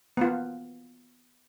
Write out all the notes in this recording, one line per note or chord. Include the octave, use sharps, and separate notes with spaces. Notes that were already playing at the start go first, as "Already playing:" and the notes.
B3 F4